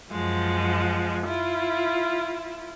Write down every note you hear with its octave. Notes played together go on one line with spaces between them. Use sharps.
F#2 F3 G#3 F#5
E4 F4